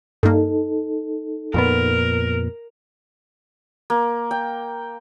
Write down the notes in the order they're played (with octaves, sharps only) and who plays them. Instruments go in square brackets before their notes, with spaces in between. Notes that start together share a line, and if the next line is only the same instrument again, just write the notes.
[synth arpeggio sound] G2 A#3 [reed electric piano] D#4 A4
[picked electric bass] F2 A#2 B3 [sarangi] A#4
[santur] A#3
G5